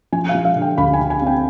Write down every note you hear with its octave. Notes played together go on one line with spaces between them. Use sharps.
F3 G#5
F5
F3
F5
D3
G5
D2 B5
G#5
D3
G#5
C4 G5